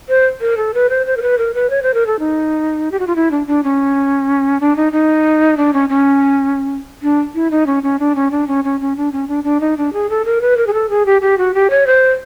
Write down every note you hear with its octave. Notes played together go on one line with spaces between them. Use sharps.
C5
A#4
A4
B4
C5
C5
A#4
B4
A#4
B4
C#5
C5
A#4
A4
D#4
G4
F#4
F4
E4
D4
D4
C#4
D4
D#4
D#4
D4
C#4
C#4
D4
E4
D#4
C#4
C#4
D4
C#4
D4
C#4
C#4
C#4
D4
C#4
D4
D4
D#4
D4
G#4
A4
A#4
B4
A#4
G#4
A4
G#4
G4
G4
F#4
G4
C#5
C5